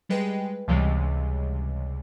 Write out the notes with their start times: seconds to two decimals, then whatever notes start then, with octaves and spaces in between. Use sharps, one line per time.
0.09 G3 G#3 B4 G5
0.68 C#2 C3 E3 G3 G#3